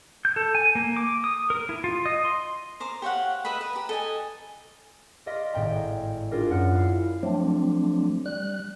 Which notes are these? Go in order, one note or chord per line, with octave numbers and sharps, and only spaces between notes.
G6
A4
G#5
A#3
D6
D#6
A#4
E4
F4
D#5
C6
A#4 C5 A#5 D6
G4 C#5 F5 F#5
B4 D#5 E5 B5
B4
G4 A#5
A4 D#5 G#5
D5 D#5 F5 C6 A#6 B6
G#1 A2 G5 A#5
D4 F4 G#4 A#4 D5
F#2 A#4 F#5
E4 F5 C7
F3 F#3 A3 C4 D4
G3 F#6